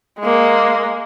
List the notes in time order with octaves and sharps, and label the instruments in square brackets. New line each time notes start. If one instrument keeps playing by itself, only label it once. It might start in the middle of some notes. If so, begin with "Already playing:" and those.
[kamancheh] G#3 A#3